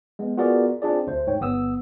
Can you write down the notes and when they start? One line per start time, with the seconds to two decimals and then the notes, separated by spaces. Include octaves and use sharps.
0.19 G#3 B3
0.37 B3 F4 F#4 G#4 A#4 D5
0.82 C4 D4 F4 G#4 D5
1.07 D2 A3 C5
1.27 G#2 C#5 G5
1.40 G1 B3 D#6 E6